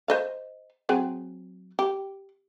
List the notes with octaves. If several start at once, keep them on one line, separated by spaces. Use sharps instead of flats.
C5 D#5 F5
F#3 C4 G#4
G4